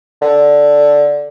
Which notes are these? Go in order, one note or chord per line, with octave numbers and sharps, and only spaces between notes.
D3